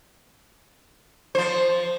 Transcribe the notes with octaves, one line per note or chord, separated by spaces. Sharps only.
F3 C5